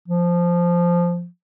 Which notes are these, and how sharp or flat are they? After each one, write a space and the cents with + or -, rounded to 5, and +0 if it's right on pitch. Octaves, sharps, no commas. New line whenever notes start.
F3 -5